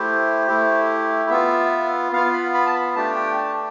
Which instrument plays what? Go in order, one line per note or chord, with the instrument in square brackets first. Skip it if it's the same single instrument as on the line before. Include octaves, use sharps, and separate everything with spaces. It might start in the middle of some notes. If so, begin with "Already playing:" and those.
Already playing: [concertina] A3 E4 G4 C5
A3 E4 G4
B3 F4 E5
B3 F4 F5
B5
B5
A5
B5
A3 D4 G4 A5
G5
A5